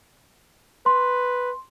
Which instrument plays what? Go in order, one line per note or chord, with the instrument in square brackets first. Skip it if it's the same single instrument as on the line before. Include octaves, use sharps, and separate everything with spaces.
[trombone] B4 [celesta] C6